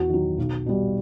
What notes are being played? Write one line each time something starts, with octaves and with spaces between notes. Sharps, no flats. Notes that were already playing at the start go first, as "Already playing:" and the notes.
Already playing: E2 F#4
D#3 F#3
B1
B2 G3